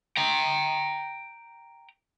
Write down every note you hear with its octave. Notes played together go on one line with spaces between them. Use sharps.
G5 A#5